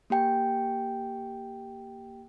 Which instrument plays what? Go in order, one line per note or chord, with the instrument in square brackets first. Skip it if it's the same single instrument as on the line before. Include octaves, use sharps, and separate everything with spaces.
[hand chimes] A#3 G4 G5 G#5